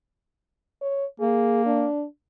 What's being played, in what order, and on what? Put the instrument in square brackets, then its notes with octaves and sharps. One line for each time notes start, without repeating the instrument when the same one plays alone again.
[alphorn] C#5
[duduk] A#3 [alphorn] G#4
[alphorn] D4